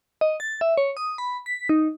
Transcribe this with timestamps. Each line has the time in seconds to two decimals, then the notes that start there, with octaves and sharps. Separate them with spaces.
0.21 D#5
0.40 A6
0.61 E5
0.77 C#5
0.97 D#6
1.18 B5
1.46 B6
1.69 D#4